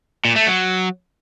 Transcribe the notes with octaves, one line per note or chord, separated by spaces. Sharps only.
A#2
A3
F#3